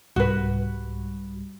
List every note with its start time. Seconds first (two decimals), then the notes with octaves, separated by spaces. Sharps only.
0.16 C2 G#2 G3 F#4 B4